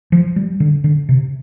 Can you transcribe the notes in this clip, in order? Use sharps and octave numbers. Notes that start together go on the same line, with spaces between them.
F3
G3
D3
D3
C3